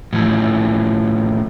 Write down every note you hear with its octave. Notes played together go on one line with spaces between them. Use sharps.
A2 E3 F3